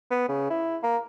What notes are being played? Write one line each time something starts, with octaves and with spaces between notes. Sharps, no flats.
B3
C#3
E4
A#3